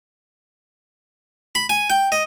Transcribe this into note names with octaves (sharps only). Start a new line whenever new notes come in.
B5
G#5
G5
D#5